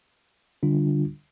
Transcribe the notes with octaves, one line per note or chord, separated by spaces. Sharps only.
D3 G3 D4 F4